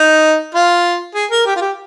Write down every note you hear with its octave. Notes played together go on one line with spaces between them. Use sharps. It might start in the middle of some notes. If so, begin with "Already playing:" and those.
Already playing: D#4
F4
G#4
A#4
G4
F4
G4